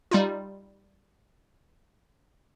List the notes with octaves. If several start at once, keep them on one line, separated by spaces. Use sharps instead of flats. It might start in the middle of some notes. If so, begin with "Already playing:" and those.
G3 D#4 F4